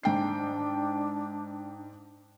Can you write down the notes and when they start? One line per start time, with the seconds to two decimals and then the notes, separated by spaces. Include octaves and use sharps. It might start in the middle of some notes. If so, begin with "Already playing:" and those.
0.03 G#2 D4 G5 C7